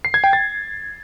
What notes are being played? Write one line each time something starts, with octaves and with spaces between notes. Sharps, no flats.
C7
G#6
G5
A6